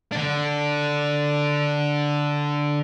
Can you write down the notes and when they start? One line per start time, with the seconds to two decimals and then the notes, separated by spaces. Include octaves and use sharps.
0.12 D3 D4